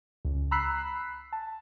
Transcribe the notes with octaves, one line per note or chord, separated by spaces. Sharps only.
C#2
A#5 B5 E6 F#6 B6 C7
A5